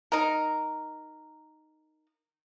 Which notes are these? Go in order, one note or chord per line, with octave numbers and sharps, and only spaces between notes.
D#4 A#4